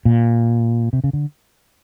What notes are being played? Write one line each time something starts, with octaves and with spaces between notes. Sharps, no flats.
A#2
C3
C#3
D3